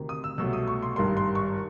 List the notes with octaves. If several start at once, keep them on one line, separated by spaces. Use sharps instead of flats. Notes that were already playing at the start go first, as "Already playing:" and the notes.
Already playing: D2 C3 D#3
D#6
E6
C2 B2 F#3 A3 E6
D#6
C#6
C6
G#1 G2 D#3 G3 C6
C6
C#6